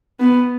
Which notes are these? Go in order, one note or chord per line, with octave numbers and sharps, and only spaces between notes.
B3